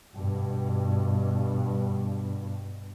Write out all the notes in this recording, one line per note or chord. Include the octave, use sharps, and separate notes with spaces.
G2 B2